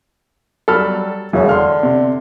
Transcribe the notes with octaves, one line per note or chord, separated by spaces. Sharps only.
F#3 G3 A4 B5 F6
E1 F#2 C#3 E3
D3 C6 F6
C3